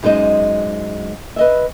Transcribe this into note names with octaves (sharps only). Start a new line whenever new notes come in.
F#2 G#3 D#4 C5 D#5
B4 D#5 E5